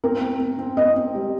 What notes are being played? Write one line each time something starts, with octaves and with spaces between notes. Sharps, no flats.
C4 A#4
C4
C4
C4
C4 D#5
C4
G3